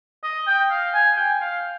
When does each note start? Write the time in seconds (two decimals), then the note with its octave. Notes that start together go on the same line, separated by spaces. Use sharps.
0.23 D#5
0.47 G5
0.70 F5
0.93 G#5
1.17 G5
1.41 F5